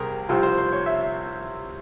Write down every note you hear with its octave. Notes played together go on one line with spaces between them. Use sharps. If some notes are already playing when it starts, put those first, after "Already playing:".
Already playing: C2 C3 G4 G#4 A#4
C2 C3 F3 C4 C5
C5
C5
C#5
E5